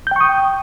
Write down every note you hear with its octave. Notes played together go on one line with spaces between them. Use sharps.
G5 C#6 D#6 G6